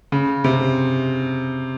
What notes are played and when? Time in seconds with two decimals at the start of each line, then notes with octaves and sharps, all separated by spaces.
0.12 C#3
0.44 C3